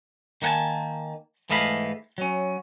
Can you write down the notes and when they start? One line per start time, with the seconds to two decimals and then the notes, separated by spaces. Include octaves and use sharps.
0.42 D#3 A#3 F#5 G#5 A5
1.50 G#2 E3 A3 D#5 F5 B5
2.18 F#3 C#4